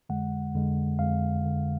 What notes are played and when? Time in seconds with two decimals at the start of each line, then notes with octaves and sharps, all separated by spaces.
0.09 F2 D3 G#3 F#5
0.54 F2 D3 G#3
0.99 F2 D3 G#3 F5
1.44 F2 D3 G#3